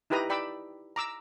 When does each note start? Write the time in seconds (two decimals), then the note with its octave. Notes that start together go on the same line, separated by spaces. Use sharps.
0.10 D#4 E4 G4 B4 A#5 D#6
0.29 D5 G5 B5 D6 E6
0.96 A#5 D6 E6